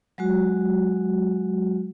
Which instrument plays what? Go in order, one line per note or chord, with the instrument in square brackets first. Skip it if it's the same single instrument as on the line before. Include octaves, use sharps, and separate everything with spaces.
[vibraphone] F#3 G#3 F#4